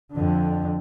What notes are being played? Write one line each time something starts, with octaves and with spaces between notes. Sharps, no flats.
F2 D3